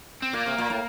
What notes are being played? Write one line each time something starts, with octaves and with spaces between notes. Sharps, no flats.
C4
A#2 A#3
C3
A#2
A2